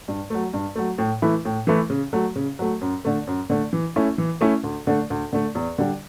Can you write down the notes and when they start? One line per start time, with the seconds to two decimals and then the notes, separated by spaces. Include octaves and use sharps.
0.08 G2
0.30 F#3 A3
0.53 G2
0.76 F#3 A3
0.98 A2
1.22 E3 A3 E4 B4
1.45 A2
1.67 E3 A3 E4 B4
1.90 C#3
2.13 F#3 A3
2.36 C#3
2.59 F#3 A3
2.81 F#2
3.05 D3 A3
3.27 F#2
3.50 D3 A3
3.73 E3
3.96 A3 C#4 E4
4.18 E3
4.41 A3 C#4 E4
4.64 D2
4.87 D3 A3
5.10 D2
5.33 D3 A3
5.55 E2
5.78 D3 G3